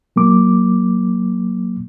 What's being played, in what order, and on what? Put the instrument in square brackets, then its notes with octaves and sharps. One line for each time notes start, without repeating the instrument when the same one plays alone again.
[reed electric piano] F#3 A#3 D6